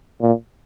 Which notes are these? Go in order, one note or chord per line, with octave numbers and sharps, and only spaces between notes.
A#2